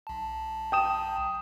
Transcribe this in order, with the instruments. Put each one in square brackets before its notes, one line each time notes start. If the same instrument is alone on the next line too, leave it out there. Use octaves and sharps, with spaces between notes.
[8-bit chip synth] B1 A5
[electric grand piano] G5 D#6 E7